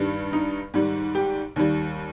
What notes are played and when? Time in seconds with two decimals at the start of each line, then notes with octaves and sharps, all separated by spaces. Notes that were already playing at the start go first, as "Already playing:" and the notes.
Already playing: G2 D#3 G3
0.33 D#4
0.74 G#2 D#3 G3
1.15 G4
1.56 D#2 D#3 G3